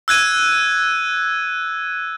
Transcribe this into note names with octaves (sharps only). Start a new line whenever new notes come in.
E6 F#6 G#6 D#7